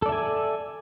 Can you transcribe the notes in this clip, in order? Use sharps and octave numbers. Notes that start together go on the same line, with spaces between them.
A4 D5 E5 G#5